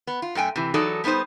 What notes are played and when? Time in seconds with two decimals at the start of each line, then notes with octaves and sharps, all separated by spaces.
0.07 B3
0.22 F4
0.35 F#2 A3 G5 G#5
0.56 C3 E3
0.74 E3 F#3 D#4 G#4 A4 D5
1.04 G3 B3 D4 D#4 C5